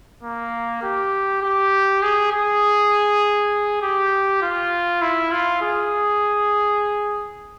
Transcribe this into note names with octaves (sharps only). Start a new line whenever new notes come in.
A#3
G4
G4
G#4
G#4
G4
F4
E4
F4
G#4